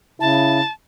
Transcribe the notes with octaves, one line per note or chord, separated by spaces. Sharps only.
C#3 E4 A5